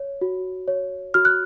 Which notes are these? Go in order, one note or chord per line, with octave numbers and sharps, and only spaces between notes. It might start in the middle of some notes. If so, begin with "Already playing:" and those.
Already playing: C#5
F#4
C#5
F#4 F6
F#6